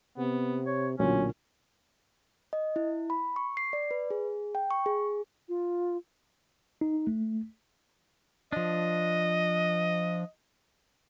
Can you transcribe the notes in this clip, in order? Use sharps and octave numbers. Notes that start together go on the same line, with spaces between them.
C3 B3
C#5
B1 A#2 D3 F#3 C#4
D#5
E4
B5
C#6
C7
D5
B4
G#4
G5
C#6
G#4
F4
D#4
A3
F3 D4 D#5